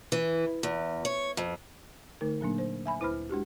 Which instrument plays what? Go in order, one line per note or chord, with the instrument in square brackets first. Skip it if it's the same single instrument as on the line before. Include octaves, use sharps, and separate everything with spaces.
[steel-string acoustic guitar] E3
E2
C#5
F2
[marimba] D3 A3 D#4 A#4
A#2 F#3 A#3 D4
C5
E5 G#5 B5
D2 E4 B4 C5 B5 F6
G#3 D4 F#4 G4